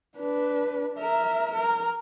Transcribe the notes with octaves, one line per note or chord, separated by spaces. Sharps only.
D4 B4
A#4 E5
A#4